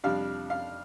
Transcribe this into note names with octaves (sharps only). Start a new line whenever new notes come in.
F2 C3 G3 D4 F5
F5